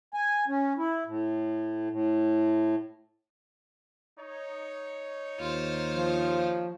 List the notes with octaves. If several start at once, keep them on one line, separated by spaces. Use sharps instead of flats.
G#5
C#4
E4
A2
A2
D#4 C#5
D#2 F4 C5
F3